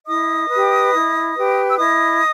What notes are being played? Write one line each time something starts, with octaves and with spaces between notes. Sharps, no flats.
E4 D#5 D#6
B4
G4
E4
G4 B4
E6
E4 D#5 D#6